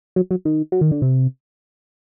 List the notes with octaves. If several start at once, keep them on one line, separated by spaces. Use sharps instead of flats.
F#3
F#3
D#3
F#3
D#3
D3
C3